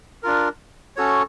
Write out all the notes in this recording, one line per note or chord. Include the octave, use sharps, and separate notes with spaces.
D4 F4 A#4
C#4 F#4 A4 C#5